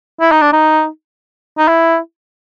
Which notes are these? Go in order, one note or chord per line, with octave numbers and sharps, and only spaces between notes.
E4
D#4
D4
D#4
D#4
E4